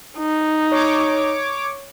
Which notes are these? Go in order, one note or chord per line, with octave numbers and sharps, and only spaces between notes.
D#4
C#5 D6